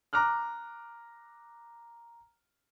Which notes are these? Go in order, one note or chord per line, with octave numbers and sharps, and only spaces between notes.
A#5 D6 F6 F#6